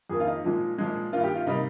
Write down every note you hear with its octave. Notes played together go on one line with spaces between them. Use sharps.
F2 D#3 A#3 G#4
F4
D#4
A#2 F3 G#3
A#2 F3 G#3
G2 D#3 A#3 F4
G4
F4
C3 G3 A#3 D#4